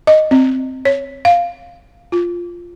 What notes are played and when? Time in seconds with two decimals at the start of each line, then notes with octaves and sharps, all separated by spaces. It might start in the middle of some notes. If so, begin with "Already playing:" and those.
0.07 D#5
0.31 C4
0.85 C#5
1.25 F5
2.12 F4